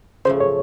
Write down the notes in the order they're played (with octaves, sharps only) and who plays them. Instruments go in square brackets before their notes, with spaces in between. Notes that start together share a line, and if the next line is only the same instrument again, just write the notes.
[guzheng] C#3 F3 A3 [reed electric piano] C5
[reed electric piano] C#5